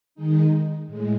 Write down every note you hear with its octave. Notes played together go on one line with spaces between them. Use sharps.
D#3 G#3 D#4
A2 G#3